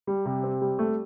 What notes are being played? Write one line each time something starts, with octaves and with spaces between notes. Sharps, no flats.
G3
C3
C4
G3
A3